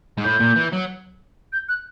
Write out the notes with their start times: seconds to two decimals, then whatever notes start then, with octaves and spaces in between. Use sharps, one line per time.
0.18 G#2
0.24 A2 G6
0.40 A#2
0.56 E3
0.73 F#3
1.53 G6
1.69 F#6